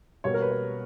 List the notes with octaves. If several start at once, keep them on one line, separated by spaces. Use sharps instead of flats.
B2 G3 A#3 C#5
A#4
B4
C#5